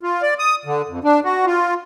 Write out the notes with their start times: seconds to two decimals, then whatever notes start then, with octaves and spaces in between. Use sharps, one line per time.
0.03 F4
0.22 D5
0.39 D#6
0.65 D3
0.89 F2
1.04 D4
1.24 F#4
1.46 F4